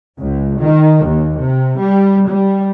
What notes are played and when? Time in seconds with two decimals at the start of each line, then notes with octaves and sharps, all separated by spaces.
0.20 C#2
0.59 D#3
1.06 D#2
1.40 C3
1.79 G3
2.29 G3